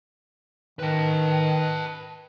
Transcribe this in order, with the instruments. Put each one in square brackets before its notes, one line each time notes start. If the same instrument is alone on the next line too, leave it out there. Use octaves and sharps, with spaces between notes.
[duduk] D#3 [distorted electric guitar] B4 A5